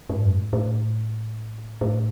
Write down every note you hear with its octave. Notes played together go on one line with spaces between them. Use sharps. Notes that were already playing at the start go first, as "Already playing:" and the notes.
G#2
F#2
A2
A2
A2